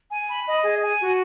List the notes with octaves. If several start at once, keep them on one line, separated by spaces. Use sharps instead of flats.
G#5
B5
D#5
G#4
G#5
F#4